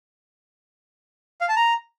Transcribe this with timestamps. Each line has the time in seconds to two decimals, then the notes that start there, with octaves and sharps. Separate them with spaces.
1.41 F5
1.49 A5
1.56 A#5